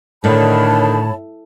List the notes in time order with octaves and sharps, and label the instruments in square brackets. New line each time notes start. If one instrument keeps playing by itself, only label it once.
[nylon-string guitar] A2 [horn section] D3 D#3 [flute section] C#5 A5 B5